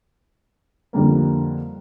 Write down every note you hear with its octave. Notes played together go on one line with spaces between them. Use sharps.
F2 D3 G3 A#3